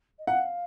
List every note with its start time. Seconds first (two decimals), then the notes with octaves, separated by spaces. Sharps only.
0.18 D#5
0.27 F5 F#5